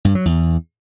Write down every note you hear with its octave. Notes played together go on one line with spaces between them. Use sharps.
G2
F#3
E2